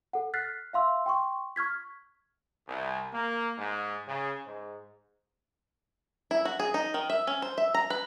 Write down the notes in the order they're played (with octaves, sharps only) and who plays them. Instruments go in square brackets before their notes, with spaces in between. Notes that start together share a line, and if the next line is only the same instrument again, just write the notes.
[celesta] A4 F#5
F6 F#6 A6 B6 C7
E5 F5 C6 E6
G5 C6 C#6
C#6 F6 G#6 B6
[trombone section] C2
A#3
G#2
C#3
G#2
[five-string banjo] E4
F#4
G#4
D#4
D#3
E5
C#4
C5
E5
A#5
B4